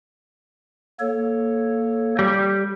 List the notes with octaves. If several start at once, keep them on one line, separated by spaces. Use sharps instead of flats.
A#3 A4 C#5
G3